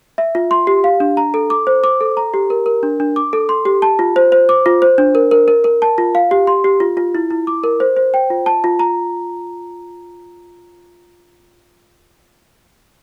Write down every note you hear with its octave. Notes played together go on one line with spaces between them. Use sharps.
E5
F4
C6
G4
F5
D4
A#5
A4
D6
C5
D6
A4
A#5
G4
A#4
A#4
D4
D4
D6
A4
C6
G4
A5
F4
C5
C5
D6
F4
C5
D4
A#4
A#4
A#4
A#4
A5
F4
F5
G4
C6
G4
F4
F4
E4
E4
D6
A#4
C5
C5
G5
F4
A5
F4
A#5